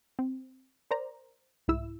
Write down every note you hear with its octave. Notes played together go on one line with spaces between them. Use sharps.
C4
A#4 C5 D5 A#5
C2 G#2 E4 E6